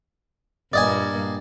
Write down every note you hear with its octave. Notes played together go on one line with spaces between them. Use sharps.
G2 A#2 A#3 D5 D#5 G#5